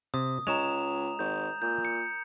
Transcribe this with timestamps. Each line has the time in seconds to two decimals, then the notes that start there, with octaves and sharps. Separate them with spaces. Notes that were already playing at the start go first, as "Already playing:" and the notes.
0.14 C3 D#6
0.47 C#2 G#3 C#5 A#5 E7 F7
1.19 G#1 G6
1.62 A#2 G6
1.85 C#7